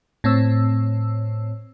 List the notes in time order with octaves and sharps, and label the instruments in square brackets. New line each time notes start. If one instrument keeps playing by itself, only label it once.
[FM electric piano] A2 C4 C#5 E6